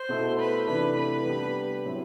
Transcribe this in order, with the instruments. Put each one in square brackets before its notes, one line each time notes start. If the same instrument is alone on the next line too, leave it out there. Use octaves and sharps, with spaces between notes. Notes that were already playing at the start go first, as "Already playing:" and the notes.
Already playing: [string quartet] C5
[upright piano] B2 A3 E4 A4
[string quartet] B4
[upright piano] C3 E3 A3 D4 [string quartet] B4
[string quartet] B4
[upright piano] G3 B3 D4 G4
A2 F#3 C4 E4